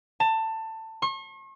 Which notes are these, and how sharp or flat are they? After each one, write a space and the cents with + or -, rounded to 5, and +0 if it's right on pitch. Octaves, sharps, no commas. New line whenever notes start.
A5 +20
C#6 -45